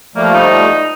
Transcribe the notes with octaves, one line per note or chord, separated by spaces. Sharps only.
F3 G3 A3 A#3
D#4